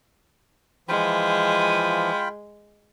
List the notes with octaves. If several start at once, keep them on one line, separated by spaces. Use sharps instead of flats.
E3 F3 G#3 F4 G5 B5